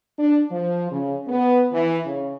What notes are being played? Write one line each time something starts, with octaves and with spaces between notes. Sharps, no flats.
D4
F3
C#3
B3
E3
C#3